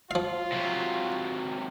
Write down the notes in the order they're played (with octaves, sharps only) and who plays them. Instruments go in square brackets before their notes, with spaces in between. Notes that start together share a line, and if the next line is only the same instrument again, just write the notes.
[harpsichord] F3 F5 [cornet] F4
[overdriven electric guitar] C3 F#3